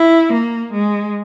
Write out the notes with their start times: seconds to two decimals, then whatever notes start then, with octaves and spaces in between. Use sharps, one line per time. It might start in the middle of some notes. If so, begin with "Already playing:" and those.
Already playing: E4
0.33 A#3
0.73 G#3